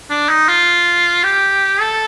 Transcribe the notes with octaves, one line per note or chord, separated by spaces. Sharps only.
D4
D#4
F4
G4
A4